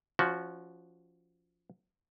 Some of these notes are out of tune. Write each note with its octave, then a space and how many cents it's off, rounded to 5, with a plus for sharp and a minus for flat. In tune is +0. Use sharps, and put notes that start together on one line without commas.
F3 -15 C#4 +20 F#4 +0